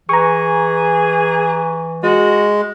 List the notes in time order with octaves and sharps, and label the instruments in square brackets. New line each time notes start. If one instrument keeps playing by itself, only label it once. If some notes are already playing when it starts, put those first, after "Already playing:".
[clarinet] E3 [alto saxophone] G#4 [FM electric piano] A#5 C#6
[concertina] G#3 [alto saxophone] F#4